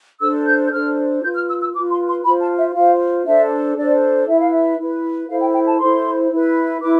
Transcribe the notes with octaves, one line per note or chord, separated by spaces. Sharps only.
D4 A4 C5 E6
G6
G6
D4 A4 C5 F6
F4 B4 G6
F6
E6
E6
F4 B4 D6
C6
C6
F4 C5 B5
A5
E5
F4 C5 F5
D4 A4 C5 E5
D4 A4 C5 D5
E4 B4 E5
F5
E5
E4 B4
E4 A4 C5 F5
G5
G5
A5
E4 A4 C5 C6
E4 B4
E4 B4 D6